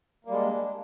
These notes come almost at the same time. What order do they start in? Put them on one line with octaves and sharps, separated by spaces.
A#3 G3 G#3 D4